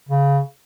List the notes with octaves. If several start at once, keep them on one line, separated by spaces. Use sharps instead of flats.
C#3